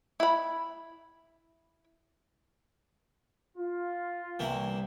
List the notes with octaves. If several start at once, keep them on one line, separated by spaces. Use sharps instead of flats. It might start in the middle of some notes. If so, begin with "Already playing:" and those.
E4 B5
F4
C2 E3 A#3 E4